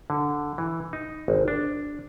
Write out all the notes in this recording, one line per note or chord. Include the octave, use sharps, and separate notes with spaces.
D3
E3
D#4
G#1
D4